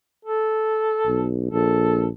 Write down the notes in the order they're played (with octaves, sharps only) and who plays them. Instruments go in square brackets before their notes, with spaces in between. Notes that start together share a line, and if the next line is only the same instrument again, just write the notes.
[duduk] A4
[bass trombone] B1
[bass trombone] A#1 [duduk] A4